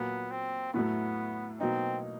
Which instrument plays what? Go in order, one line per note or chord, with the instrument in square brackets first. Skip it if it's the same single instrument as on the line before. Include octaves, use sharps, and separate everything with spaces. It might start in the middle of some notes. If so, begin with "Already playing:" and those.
Already playing: [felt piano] A#2 F#3 A#3 [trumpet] B3
[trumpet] C4
[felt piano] A2 F#3 A3 [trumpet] B3
[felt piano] B2 F#3 A#3 D#4 [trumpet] C4